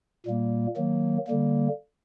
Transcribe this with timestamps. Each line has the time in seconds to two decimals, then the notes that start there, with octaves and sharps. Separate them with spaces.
0.26 A#2 G3 A#3
0.77 D#3 F#3 A#3
1.27 D3 G3 A#3